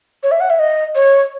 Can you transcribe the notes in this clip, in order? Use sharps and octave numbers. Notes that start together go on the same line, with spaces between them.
C#5
E5
F#5
E5
D#5
C#5